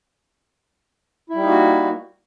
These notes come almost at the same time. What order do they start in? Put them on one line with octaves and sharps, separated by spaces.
E4 G3 D#4 A#3 F#4